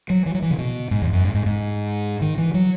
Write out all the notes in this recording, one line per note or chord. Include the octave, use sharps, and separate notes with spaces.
F#3
E3
F#3
E3
C#3
B2
G#2
E2
F#2
G#2
G#2
G#2
D#3
E3
F#3